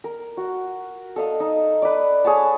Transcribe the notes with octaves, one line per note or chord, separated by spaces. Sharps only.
A#4
F#4
A4 D#5 F5
D#4
B4 D5
G#4 C#5 F#5 A5